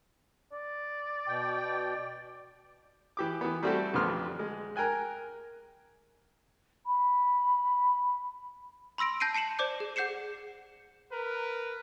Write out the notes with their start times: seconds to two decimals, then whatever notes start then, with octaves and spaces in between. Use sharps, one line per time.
0.52 D5
1.28 B2 G5
3.17 E3 G4 D6
3.41 E3 B3
3.63 G3 A3 C4 F#4 G4 A4
3.94 A1 F2 D3 B3 C6 F6
4.39 G#3
4.76 A#4 G5 G#5 F#6
6.86 B5
8.98 B5 C6 E6 A#6 D7
9.20 A5 G6 A#6 C7 D7 D#7
9.34 A5 C7 C#7 E7 F#7
9.59 C5 D5 D6 G6
9.80 G#4
9.96 G#4 F#5 G6 C7 C#7 E7
11.12 A#4 B4